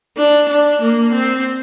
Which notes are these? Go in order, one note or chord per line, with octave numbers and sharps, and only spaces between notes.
D4
D4
A#3
C4